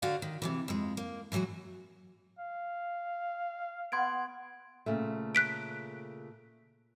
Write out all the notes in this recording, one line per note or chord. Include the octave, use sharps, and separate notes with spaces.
D3 F#4 D5 F5 F#5
D#3
C3 D#3 E3
F2 G#3
A#3
A2 E3 F#3 G#3 F#4
F5
B3 C6 G#6 D7
A#2 C#3 A3
F#6 B6 D7